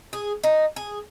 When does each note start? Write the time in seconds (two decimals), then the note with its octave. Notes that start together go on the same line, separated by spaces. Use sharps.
0.13 G#4
0.44 D#4
0.76 G#4